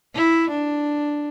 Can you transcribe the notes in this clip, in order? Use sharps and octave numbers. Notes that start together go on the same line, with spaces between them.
E4
D4